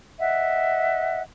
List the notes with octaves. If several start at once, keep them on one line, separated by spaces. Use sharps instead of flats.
D#5 E5 F#5